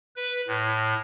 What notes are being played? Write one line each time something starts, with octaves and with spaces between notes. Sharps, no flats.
B4
A2